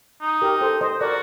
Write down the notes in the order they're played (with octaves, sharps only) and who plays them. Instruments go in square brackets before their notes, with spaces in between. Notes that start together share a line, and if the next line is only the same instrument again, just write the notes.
[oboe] D#4
[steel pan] G4 A#4
A4 C5
C5 D#5
[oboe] F#4 [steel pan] A#4 D5